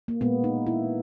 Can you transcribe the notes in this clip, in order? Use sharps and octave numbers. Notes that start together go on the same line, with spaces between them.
A#3
A#2 G#3 B3
D#4
E4